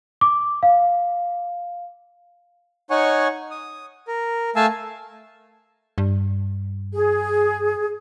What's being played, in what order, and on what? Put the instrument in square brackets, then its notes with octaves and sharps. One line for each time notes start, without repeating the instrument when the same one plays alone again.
[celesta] D6
F5
[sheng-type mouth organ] D#4 C#5 F#5 G#5 C#6
D#6
A#4
A3 F5 G#5 A5 E6
[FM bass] G2
[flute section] G#4